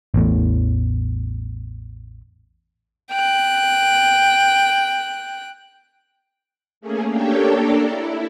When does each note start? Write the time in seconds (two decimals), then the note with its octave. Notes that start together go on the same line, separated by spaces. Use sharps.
0.14 A1 E2 A2
3.11 G5 F#6
6.81 A3 A#3 C#4 G#4
7.10 A#3 D4 G4 A4 C#5 G5
7.53 D4 A4 A#4 D5
7.83 E4